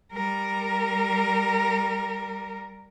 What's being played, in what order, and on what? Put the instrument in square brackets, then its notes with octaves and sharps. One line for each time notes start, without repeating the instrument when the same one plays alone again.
[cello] G3 A#4